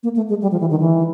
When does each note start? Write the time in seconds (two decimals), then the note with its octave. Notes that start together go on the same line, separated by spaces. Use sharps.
0.03 A#3
0.16 A3
0.29 G#3
0.42 G3
0.52 F3
0.60 E3
0.71 D#3
0.80 E3